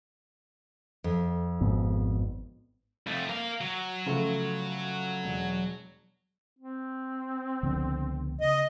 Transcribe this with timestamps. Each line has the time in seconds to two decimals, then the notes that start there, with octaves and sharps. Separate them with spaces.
1.04 F2
1.60 G#1 G#2 B3
3.07 F2 A3
3.29 A#4 F5
3.61 F#3
4.06 C#3 F3 A3
5.24 E1
6.58 C4
7.63 C#2 D3 F3 B3
8.41 C#3 D#5